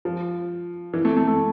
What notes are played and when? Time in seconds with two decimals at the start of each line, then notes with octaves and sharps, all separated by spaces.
0.05 F3
0.94 E3
1.05 A3
1.17 A3
1.27 A3